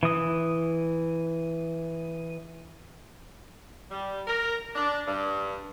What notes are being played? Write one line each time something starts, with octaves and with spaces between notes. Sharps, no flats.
E3 D#6
G3
A#4
D4
G2